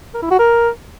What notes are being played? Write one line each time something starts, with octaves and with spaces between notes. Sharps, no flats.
A#4
E4
F#4
A#4